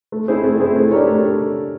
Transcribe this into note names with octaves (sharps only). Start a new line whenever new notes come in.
A3
C4 E4 G#4 C5
A3
C4 E4 G#4 C5
A3
D4 G4 A#4 C#5
A3